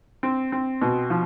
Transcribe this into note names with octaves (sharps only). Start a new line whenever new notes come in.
C4
C4
B2
F3